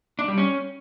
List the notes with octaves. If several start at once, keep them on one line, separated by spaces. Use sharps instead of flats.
D4
G3
C#4